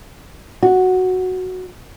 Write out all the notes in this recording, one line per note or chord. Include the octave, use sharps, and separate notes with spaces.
F#4